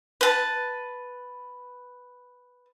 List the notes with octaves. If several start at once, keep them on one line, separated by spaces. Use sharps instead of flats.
B4 A5